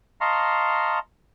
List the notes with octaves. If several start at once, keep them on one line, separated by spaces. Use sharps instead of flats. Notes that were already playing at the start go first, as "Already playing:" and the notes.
D#5 F5 A5 A#5 C6 C#6